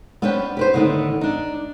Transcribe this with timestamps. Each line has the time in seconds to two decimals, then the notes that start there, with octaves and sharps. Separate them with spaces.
0.22 B3 C#4 D4 B4 C5 G5
0.57 G4 B4 C5
0.74 A2 D3 D#3 B3
1.21 D4 D#4